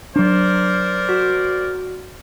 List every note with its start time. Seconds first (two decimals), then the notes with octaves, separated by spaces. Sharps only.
0.16 F#3 D4 A#4 C5 D5
1.09 F#4